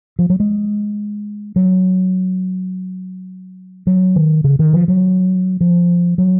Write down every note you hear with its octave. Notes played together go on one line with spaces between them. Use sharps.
F3
F#3
G#3
F#3
F#3
D#3
C#3
D#3
F3
F#3
F3
F#3